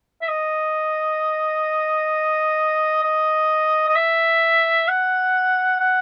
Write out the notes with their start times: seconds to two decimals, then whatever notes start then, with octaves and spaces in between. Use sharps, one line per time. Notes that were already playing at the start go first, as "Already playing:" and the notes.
0.22 E5
0.28 D#5
3.03 D#5
3.88 D#5
3.96 E5
4.88 F#5
5.80 F#5